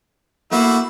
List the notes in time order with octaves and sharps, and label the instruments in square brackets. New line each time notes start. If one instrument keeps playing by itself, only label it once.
[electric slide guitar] A3 A#3 [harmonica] E4 F#4